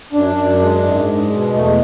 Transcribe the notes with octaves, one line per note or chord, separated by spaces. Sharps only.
F#2 D4
F#2
G#3
G#2
G#3
B2
E2 A3